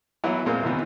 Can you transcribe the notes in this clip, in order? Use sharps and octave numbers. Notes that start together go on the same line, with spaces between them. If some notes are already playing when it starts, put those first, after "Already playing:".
E3 F#3 B3 E4
A#2 G#3 A#3 C4 F4
D#2 C3 E3 B3